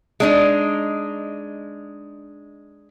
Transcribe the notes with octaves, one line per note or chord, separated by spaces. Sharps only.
G#3 D4 D#4